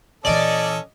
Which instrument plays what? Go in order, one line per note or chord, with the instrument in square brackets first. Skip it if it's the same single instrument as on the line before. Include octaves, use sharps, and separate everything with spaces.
[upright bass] A#2 E3 [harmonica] C#4 A4 [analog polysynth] D5 [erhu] D#5